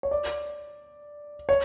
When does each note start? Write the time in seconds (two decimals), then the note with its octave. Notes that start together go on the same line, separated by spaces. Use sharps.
0.03 C#5
0.11 D5
1.49 C#5